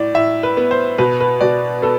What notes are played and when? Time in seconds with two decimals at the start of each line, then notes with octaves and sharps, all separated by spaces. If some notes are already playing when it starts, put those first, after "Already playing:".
Already playing: A2 D5
0.14 A2 E5
0.43 B4
0.57 B3
0.71 C5
0.98 B2 B4
1.20 B4
1.41 B2 D5
1.82 B3 A4